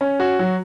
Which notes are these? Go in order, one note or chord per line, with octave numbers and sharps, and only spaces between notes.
C#4
F#4
F#3